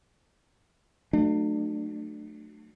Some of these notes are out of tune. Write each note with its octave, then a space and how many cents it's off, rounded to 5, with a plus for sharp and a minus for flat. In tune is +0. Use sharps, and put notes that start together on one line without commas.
F#3 -5 A3 +0 D4 +35